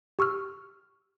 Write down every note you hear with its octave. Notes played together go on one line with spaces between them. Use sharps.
G4 C#6 E6 F6